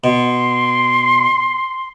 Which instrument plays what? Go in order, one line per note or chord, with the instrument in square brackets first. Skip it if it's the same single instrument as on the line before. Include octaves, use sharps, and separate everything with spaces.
[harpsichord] B2 [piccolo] C6